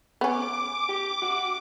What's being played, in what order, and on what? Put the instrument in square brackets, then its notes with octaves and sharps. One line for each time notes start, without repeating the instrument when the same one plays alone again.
[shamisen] B3 C#4 [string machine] D6
[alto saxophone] G4
F#4